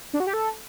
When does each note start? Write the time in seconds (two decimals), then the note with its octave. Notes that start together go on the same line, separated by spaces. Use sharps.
0.13 D4
0.20 F#4
0.27 G4
0.34 A4